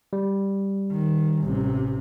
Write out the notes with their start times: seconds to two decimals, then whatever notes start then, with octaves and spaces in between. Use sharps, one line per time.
0.13 G3
0.92 D#3
1.42 A1 C3